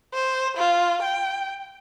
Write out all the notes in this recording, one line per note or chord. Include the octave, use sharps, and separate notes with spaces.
C5
F4
G5